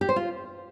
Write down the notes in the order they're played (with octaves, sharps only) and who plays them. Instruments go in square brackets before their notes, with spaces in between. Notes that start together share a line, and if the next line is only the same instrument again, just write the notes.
[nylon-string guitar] G4
C5
F4